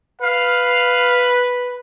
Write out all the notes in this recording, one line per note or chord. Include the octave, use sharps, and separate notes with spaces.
B4 F5